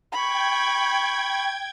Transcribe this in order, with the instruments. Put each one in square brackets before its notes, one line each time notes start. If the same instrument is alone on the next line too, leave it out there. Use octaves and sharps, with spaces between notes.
[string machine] G5 G#6 [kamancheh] B5 C#6